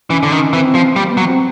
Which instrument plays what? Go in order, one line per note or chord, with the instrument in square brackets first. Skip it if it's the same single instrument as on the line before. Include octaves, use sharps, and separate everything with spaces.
[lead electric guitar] E3 [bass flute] C#4
[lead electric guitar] D3
D#3
[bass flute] C#4
[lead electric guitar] E3 [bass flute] C4
[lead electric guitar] F3
[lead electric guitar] G3 [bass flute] A#3
[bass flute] B3
[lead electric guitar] F#3
[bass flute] C4